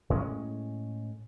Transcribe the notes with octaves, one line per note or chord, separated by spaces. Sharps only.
A2 G#3 C4 C#4